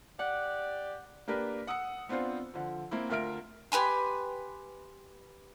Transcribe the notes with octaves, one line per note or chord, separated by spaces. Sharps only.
G4 D5 F#5
A#3 D4 G4 A#4 B4
F#5 D#6 E6 C#7
B3 C4 D4 F4 C5
D3 F3
A#3 C4 E4
D2 F4 A#4 E5 F6 D7
G4 B4 G#5 C6